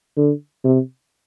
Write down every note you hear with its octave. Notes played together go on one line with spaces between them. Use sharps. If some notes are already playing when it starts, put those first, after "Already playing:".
D3
C3